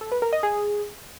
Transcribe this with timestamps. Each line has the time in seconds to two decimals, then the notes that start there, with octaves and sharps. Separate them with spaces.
0.01 A4
0.12 B4
0.22 A#4
0.33 D#5
0.43 G#4